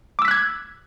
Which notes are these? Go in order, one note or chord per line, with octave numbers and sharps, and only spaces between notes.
D6 E6 F#6 G#6 B6